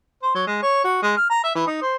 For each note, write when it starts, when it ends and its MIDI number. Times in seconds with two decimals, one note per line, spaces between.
0.23 0.31 72
0.35 0.46 54
0.47 0.62 56
0.63 0.80 73
0.84 0.99 66
1.03 1.13 56
1.17 1.29 89
1.30 1.42 82
1.44 1.51 76
1.55 1.67 52
1.67 1.79 63
1.82 1.96 72